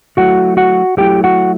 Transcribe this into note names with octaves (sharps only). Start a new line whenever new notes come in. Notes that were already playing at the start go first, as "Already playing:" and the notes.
F#3 A3 E4 F#4 F#5
F#4 F#5
F#3 A3 E4 G4 G5
F#4 F#5